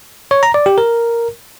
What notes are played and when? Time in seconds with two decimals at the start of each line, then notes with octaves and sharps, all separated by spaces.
0.31 C#5
0.43 A#5
0.54 D5
0.66 G4
0.78 A#4